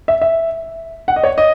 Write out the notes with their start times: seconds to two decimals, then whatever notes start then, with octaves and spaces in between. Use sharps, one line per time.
0.08 E5
0.21 E5
1.08 F#5
1.16 D#5
1.23 C#5
1.38 D#5